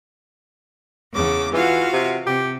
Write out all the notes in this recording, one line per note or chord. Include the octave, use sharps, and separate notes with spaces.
E2 C#3 D6
E3 F4 F#4 F5
C3
C3 G4